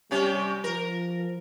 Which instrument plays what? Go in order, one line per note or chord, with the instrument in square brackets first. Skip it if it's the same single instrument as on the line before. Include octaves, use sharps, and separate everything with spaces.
[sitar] C3 C#4 G4 [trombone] G3
[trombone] F3 [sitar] A#4